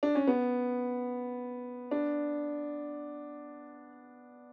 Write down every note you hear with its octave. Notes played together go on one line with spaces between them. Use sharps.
D4
C#4
B3
D4